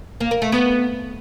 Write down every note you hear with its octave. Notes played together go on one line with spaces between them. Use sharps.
A#3
A#4
A3
B3